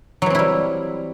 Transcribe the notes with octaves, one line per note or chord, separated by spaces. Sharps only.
E3 F#3 G3 C4 E4